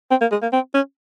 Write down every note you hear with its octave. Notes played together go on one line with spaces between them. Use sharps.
C4
A#3
G#3
A#3
C4
C#4